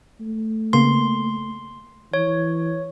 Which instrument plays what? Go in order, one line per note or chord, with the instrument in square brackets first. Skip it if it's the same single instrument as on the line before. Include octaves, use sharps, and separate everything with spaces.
[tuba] A3
[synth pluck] C#3 A#3 B3 [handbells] C6
[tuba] E3 [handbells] C#5